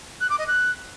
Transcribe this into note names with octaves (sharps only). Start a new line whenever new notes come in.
F#6
D6
D#5
F#6